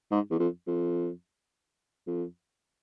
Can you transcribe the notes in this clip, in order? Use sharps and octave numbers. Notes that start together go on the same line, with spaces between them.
G#2
E2
F2
F2
F2